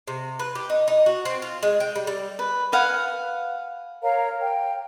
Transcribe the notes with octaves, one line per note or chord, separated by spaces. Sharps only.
C3
B4
G4
D#4
D#4
F#4
C4
F4
G#3
G5
G3
G3
B4
B4 F5 F#5 G#5
A#4 C#5 F5 A#5
G5